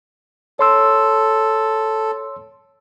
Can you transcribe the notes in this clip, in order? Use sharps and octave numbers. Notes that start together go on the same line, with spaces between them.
A4 C#5 C6 E6